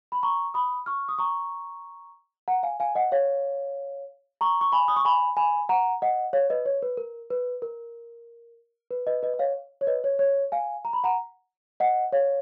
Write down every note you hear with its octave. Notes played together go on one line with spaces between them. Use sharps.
B5
A#5 C#6
B5 D#6
C#6 F6
D#6
A#5 C#6
F#5 A#5
F5 G#5
F5 G#5
D#5 F#5
C#5 F5
A#5 C#6
C#6
G#5 B5
D#6
C#6
G#5 B5
G#5 B5
F#5 A#5
D#5 F#5
C#5 F5
B4 D#5
C#5
B4
A#4
B4
A#4
B4
B4 D#5
B4 D#5
D#5
C#5 F5
C#5
B4 D#5
C#5
C#5
F5 G#5
A#5
B5
F#5 A#5
D#5 F#5
C#5 F5